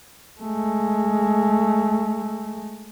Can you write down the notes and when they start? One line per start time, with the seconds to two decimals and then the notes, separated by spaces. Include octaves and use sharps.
0.41 G#3 A3